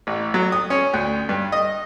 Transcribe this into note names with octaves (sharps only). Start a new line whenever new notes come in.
A1
F#3
D#6
C#4
D2
G2
D#5